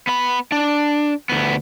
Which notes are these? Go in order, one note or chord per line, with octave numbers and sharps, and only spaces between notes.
B3 B5
D4
D2 B3